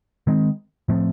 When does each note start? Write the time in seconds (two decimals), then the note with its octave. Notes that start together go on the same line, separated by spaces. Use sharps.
0.27 D#3 G#3 C4
0.88 A2 F3 A3 C4